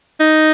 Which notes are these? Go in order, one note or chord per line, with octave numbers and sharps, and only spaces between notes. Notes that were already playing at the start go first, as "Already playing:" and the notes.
D#4